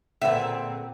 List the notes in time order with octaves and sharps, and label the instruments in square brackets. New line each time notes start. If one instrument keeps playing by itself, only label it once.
[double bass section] A#2 C4 [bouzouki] D3 G#4 B4 [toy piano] C#4 [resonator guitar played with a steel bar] E5